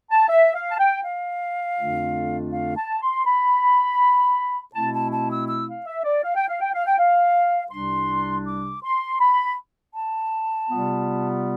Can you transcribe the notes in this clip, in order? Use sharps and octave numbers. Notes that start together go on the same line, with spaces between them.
A5
E5
F5
A5
G5
F5
F2 D3 A3 D4 F4
F5
A5
C6
B5
B2 A3 C4 E4 A5
A5
A5
E6
E6
F5
E5
D5
F5
G5
F5
G5
F5
G5
F5
C2 C3 G3 D4 C6
D6
C6
B5
A5
C3 G3 B3 F4